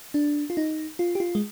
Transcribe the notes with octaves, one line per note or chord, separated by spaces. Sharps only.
D4
F4
D#4
F4
G4
F4
G#3